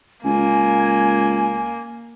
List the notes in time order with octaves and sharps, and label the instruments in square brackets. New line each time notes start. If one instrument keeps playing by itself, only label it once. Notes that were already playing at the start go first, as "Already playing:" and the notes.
[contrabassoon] C#2 [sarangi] A#3 [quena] G#5